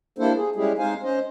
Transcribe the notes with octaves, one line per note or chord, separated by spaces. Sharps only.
G3 A#3 D4 E4 A4 C5
G#4
G3 G#3 C#4 E4 G4 G#4
G#3 C4 D#4 C5 F5 G#5
C#4 C5 D#5